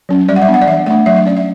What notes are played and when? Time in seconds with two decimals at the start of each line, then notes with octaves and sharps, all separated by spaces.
0.09 F#3 C#4
0.29 G3 D5
0.36 F#5
0.42 E5
0.48 B3 D4
0.54 F#5
0.62 D5
0.67 E3 E5
0.86 A3 D4 F#5
1.06 F#3 E5
1.16 E5
1.26 C#4 D5
1.37 E5